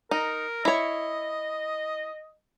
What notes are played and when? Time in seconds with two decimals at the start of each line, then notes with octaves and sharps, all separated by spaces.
0.11 D#4 A#4
0.65 E4 C#5 D#5